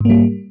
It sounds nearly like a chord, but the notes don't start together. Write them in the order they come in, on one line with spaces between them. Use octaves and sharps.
G#2 A#3 G3